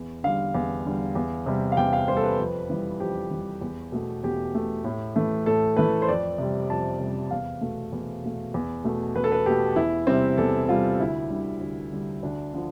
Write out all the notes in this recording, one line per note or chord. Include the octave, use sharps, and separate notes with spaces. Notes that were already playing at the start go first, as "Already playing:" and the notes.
Already playing: E2
D3 G3 F5
E2
D3 G3
E2
C3 G3
F5
E2 G5
F5
C3 G3 C5
A4
B4
F2
E3 G3
F2 G4
E3 G3
E2
B2 A3
E2 G4
B2 A3
A2
E3 A3
A2 A4
E3 A3 B4
C5
F2 D5
C3 G3
F2 A5
C3 G3
E2 F5
B2 A3
E2
B2 A3
E2
B2 A3
E2 B4
A4
B4
B2 A3 G4
E2 E4
C3 G3 C4
E2 A4
C3 G3 F4
D2 E4
D3 G3
D2
D3 G3
D2 D4
D3 F3